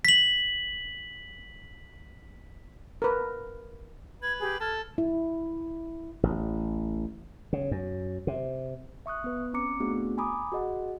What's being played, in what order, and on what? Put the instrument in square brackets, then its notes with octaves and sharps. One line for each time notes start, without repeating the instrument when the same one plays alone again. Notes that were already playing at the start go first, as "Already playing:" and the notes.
[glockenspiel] B6 F#7
[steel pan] A#4 B4
[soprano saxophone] B4 [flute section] G#6
[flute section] G4 G#4
[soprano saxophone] A4 [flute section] F6 G#6
[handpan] E4
[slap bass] A1
C#3
F#2
C3
[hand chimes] E5 C#6 D#6 F#6
B3 B4
C4 C#4 A#5 D6 C#7
A3 B3 C4 D4 F#4 G#4
G#5 A#5 B5 D6 D#6
F#4 G#4 D#5 F#5